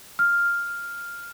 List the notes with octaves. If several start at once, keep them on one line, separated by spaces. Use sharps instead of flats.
F6